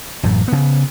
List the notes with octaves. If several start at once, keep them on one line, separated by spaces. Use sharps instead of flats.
A1 F#2 A2
C#3 B3